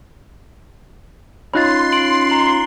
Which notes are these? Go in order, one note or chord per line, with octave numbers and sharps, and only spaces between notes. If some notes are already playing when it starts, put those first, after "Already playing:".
C#4 D#4 F4 B5 C6 F#6 A6
D7 F#7
A#5 F#7